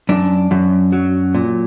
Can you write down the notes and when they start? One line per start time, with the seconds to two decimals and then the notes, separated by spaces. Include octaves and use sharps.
0.09 F#2 D4
0.51 F#2
0.92 F#3
1.34 A#2